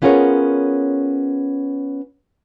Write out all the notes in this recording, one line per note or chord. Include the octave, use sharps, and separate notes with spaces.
B3 C#4 F4 G#4 A#4 C#5